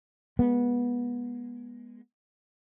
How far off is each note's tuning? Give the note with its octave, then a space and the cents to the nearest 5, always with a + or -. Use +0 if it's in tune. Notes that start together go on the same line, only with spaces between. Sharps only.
G#3 +0 B3 -25